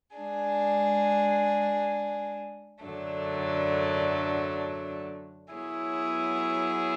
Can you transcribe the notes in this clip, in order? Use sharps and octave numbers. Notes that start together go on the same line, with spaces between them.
G#3 D4 G#4
F#2 D3 F#3 A3 D4
F#3 B3 E4 G#4 C#5